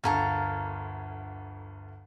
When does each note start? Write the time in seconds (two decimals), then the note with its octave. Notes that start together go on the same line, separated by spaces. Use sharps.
0.04 G1 D2 A4 A#4 F5